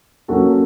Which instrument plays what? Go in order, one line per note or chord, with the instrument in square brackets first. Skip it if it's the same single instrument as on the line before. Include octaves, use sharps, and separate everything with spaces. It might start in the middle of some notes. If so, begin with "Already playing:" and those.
[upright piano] F#3 A#3 C#4 F#4 A4